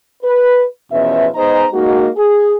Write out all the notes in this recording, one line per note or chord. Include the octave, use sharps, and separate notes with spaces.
B4
E2 B2 F3 C#4 B4 E5
B3 D#4 G#4 C5 D#5 A#5
G#3 A#3 D#4 F#4
G#4